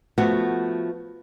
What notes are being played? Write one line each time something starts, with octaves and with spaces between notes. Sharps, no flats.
F3 A3 B3 F#4